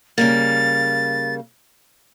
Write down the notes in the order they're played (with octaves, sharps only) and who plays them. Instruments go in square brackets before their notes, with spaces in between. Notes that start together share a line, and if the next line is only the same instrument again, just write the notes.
[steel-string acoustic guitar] C#3 G3 A#3 [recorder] A6